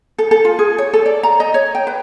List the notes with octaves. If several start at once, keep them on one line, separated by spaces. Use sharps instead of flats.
A4
A4
F4
G#4
C#5
A4
D5
A#5
D#5
C#5
G5
B4